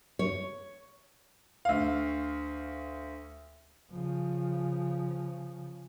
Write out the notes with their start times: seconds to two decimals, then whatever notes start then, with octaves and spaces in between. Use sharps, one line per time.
0.19 C#5
1.65 D2 F5
3.91 C#3 F3